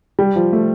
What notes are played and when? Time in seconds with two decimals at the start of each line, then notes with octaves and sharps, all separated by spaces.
0.19 G3
0.36 F3
0.53 A3